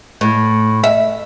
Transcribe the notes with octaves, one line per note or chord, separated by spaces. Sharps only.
A2
E5